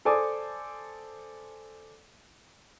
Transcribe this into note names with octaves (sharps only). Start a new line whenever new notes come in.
A4 C5 D5 G#5 D6 D#6